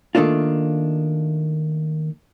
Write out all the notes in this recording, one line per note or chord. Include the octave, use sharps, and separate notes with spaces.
D#3 A3 A#3 D4 F4